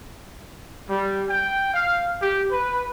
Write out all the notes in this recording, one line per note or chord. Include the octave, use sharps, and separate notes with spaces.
G3
G5
F5
G4
B4